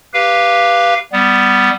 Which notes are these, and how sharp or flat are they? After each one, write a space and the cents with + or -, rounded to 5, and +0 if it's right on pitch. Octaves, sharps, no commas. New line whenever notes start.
G4 +0 B4 -10 F5 -10
G3 +0 B3 +10